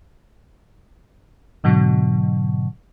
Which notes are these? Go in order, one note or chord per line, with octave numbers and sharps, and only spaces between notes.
G#2 B2 D3 F#3